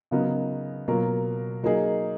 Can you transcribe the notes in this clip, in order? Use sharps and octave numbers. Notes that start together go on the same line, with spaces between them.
C#3 F#3 B3 D#4 A#4
B2 F#3 A#3 F4 A#4
F#3 A#3 D#4 G#4